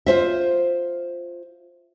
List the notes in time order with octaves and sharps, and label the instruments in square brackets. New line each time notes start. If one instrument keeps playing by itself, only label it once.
[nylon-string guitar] F4 C5 E5